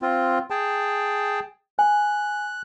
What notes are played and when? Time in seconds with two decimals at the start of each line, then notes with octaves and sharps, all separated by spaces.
0.02 C4 F4
0.50 G#4 G5 A5
1.79 G#5 F#6